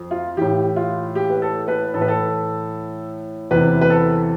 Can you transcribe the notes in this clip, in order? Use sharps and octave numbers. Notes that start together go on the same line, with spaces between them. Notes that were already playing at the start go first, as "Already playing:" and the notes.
Already playing: F2
F4
A2 E3 G4
F4
G4
B4
A4
B4
A2 E3 A4
B4
A4
E2 C3 E3 B4
B4
A4